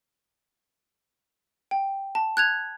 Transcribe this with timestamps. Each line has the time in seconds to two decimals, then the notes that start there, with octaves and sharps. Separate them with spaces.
1.71 G5
2.15 A5
2.37 F#6 G#6 F7